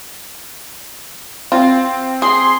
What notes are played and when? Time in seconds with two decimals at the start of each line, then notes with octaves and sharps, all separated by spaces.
1.52 C4 F4
2.22 G#4 C6